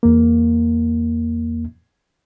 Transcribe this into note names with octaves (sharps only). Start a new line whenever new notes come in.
E2 A#3